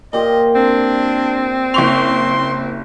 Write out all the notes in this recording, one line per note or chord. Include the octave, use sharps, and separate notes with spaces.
A#2 G4 C5 D#5
C4 D4
F#1 C6 C#6 F7